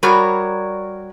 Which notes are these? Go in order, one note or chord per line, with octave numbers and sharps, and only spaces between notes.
G3 F#4 A#4 C#5 D5